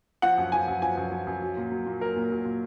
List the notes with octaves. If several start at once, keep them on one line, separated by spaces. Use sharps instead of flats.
F3 F#5
F#2
F3 G#5
F#2
F3 G#5
F#2
F3
F#2
F#3
A#2
F#3
A#2
F#3 A#4
A#2
F#3
A#2